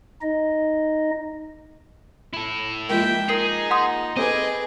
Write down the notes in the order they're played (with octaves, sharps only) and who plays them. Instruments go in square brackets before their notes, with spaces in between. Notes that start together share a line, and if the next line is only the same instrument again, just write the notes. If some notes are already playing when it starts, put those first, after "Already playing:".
[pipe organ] D#4 D#5
[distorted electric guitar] E4 A4
[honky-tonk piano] F3 G#3 A#3 [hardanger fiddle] E5 G5
[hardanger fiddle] D#4 [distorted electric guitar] G#4 [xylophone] A#4 C7
[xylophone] F#5 C6 D#6
[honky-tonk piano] C4 A4 B4 [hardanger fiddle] G#4 D6 [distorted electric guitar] D#5